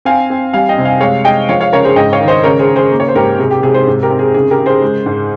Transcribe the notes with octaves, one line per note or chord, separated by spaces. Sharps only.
C4 F5 G#5
C4
G3 F5 G#5
D#5 G5
C3
F5 G#5
G#3 C#5 F5
G#3 D#5 G5
F3 C#5 F5
C#5 F5
C#3 A#4 C#5
G#4 C5
G#2 D#5 G5
C#5 F5
D#3
C5 D#5
C#3 A#4 C#5
G#4 C5
C#3
G#4 C5
A#3
C#5
C5
G#2 G4 A#4
C3 G#4
G4
C3 G#4
G#4 C5
G#2
G4 A#4
C4
G#4
C#3 G#4
G4 A#4
C#3
G#4 C5
G#3
G#2